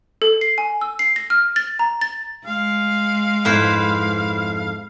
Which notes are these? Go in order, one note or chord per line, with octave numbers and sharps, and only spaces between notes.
A4
C7
G#5
E6
C7
A#6
F6
A6
A#5
A6
G#3 F5
F2 G#2 E4 B4 C5